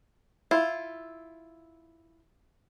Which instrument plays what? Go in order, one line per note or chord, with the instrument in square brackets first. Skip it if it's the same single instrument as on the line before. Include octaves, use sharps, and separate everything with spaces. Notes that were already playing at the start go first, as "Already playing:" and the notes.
[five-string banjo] E4 F4